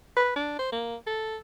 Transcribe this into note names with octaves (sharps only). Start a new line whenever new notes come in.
B4
D4
C5
A#3
A4